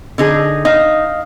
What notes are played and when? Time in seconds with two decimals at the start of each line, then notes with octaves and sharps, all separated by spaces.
0.18 D3 D#4 G#4
0.65 D#4 D#5 F5